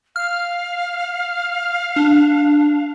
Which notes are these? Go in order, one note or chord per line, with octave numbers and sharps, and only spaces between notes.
F5 F6
D4